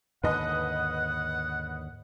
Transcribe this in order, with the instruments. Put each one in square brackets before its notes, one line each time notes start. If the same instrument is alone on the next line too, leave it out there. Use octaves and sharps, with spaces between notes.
[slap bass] D#2 G#2 D3 [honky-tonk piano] B4 D#5 [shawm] F#5